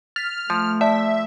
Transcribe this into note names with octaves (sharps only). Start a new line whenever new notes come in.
F6 A6 B6
F3 A3
D5 E5 A5